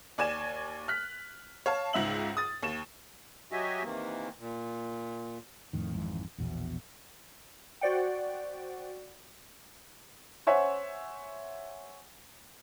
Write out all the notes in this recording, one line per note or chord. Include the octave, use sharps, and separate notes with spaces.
D#2 D5 G#5 G#6 E7
F6 F#6 B6
C#5 F5 A5
C#2 G#2 E5 F#7
D#6 A6
D#2 E7
F#3 F#4 G4 D#5 E5 G#5
C3 D#3 E3 A#3
A#2
F2 A2 D#3
G#1 F2 G#2 E3
A#1 E2 B2
F#4 C5 D5 F#5 G5
C5 C#5 E5 F#5 G#5